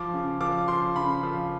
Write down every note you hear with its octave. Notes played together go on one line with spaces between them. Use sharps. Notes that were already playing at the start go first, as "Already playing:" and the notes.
Already playing: F3 D6
C#3
F3 D6
F3 C6
C#3 B5
F3